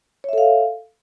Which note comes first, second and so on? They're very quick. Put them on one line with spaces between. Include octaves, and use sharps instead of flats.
C#5 E5 A4 F5